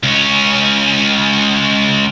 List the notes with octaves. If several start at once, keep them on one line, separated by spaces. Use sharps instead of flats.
C#2 C#4